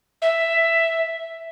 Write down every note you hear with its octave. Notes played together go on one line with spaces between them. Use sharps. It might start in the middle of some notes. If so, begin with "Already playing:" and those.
E5